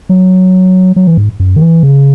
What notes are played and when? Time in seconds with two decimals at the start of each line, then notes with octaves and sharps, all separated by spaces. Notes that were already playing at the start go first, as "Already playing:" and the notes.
0.09 F#3
0.96 F#3
1.07 E3
1.18 G#2
1.40 F#2
1.56 D#3
1.62 E3
1.83 C#3